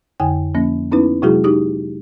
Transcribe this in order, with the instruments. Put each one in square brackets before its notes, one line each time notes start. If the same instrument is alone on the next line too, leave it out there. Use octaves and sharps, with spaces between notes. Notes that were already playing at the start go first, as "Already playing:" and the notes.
[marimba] F2 D3 G5 G#5
F3 A#3 C#4
B3 C#4 D#4 E4 B4
C3 F#3 G#3 E4 F#4 G#4
D#4 G4 D#6